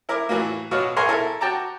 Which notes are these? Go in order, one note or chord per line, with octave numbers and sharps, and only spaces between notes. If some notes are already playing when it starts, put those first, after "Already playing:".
E4 A#4 D6
A2 E3 F#3 A#3
B2 F#3 C#5 F5
B1 G#4 A#4 G#5 C6 C#6
E4 A4 A#4
F#4 G5 A5 A#5 D6